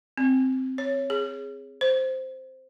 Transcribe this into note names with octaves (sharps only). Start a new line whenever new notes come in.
C4
C#5
G#4
C5